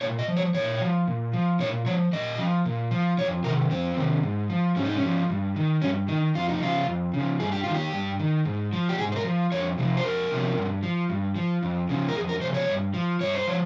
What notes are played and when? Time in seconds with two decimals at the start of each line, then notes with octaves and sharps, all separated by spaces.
0.01 A#2 C#5
0.19 D#5
0.28 F3
0.37 C#5
0.54 A#2 C#5
0.81 F3
1.07 A#2
1.33 F3
1.60 A#2 C#5
1.86 F3 C#5
2.13 A#2 D#5
2.38 F3
2.65 A#2
2.91 F3
3.18 F2 C#5
3.44 C3 D#3 A#4
3.70 F2 C4
3.97 C3 D#3
4.23 G#2
4.50 F3
4.76 G#2 C#4
4.85 D#4
4.95 C#4
5.03 F3
5.30 G2
5.56 D#3
5.82 G2 C#4
6.08 D#3 D#4
6.35 F2 F4
6.49 D#4
6.61 C#3 F3 F4
6.88 F2
7.14 C#3
7.19 F3
7.40 G2 G#4
7.52 G4
7.63 D#3 F4
7.74 G4
7.93 G2
8.19 D#3
8.45 G#2
8.73 F3
8.89 G4
8.98 G#2 G#4
9.12 C5
9.16 A#4
9.24 F3
9.52 F2 C#5
9.78 C3 F3
9.97 C5
10.04 F2 A#4
10.31 C3 F3
10.57 G2
10.83 F3
11.10 G2
11.36 F3
11.63 F2
11.89 C#3 F3
12.09 A#4
12.15 F2 G#4
12.29 A#4
12.41 C#3 F3 C5
12.54 C#5
12.69 G2
12.94 F3
13.21 G2 C#5
13.35 C5
13.47 F3 C#5